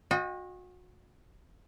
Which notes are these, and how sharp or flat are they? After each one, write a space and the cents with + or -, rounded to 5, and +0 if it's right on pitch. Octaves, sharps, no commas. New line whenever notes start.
F#4 -35 D#5 +0 G5 +25